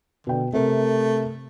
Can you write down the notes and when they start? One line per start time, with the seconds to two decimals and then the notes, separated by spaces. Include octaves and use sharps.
0.27 B2 D3 G5
0.53 C3 A3 A#4